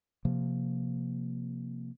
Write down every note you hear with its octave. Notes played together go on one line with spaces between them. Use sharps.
C3 F3 A#3